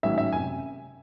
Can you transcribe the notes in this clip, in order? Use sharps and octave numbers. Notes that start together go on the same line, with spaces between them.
A1 G#2 D#3 F#3 C#4 E5
E5
F#1 C3 G#5